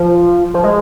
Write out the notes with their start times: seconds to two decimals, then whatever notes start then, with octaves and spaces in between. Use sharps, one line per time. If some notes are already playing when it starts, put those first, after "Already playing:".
Already playing: F3
0.54 F3
0.64 G#3